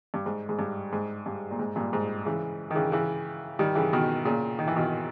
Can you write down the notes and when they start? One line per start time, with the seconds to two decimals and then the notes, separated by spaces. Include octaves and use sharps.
0.14 G2
0.26 G#2
0.49 G#2
0.59 G2
0.93 G#2
1.26 G2
1.51 A#2
1.59 G#2
1.76 G2 A#2
1.93 G#2
2.25 C#3 E3
2.71 D#3
2.75 C#3 E3
2.92 C#3 E3
3.59 D#3 G3
3.75 C#3 E3
3.93 B2 D#3
4.25 A#2 C#3
4.59 D#3
4.68 E3
4.76 B2 D#3